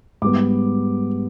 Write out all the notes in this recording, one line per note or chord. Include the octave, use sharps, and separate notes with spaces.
G#2 G3 B3 D6